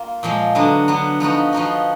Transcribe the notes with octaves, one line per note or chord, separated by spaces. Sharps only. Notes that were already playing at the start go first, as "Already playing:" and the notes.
Already playing: A#3 F4
A#2 F3 G#3
D3 F#3 B3
D3 F#3 B3
F3 B3 D#4 F#4
F3 B3 D#4 F#4